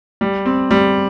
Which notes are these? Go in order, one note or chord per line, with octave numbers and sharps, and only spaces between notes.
G3
C4
G3